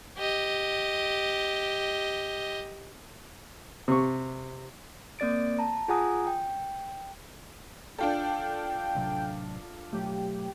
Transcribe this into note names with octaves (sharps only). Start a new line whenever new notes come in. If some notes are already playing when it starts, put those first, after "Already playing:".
G4 D#5
C3 C#6
A#3 C4 D5 A6 D7
A5 A#5
F4 G#4 F#5 G#5 A#5 D#6
G5
D4 F4 A4 G5
A1 C3 F#3
B2 F#3 A3 G4